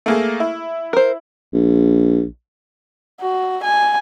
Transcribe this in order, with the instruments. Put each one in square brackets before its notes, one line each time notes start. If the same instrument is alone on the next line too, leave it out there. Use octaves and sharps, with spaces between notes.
[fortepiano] A3 A#3 G#4
E4
[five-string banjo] A#4 C5
[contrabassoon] A#1
[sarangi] F#4
G#5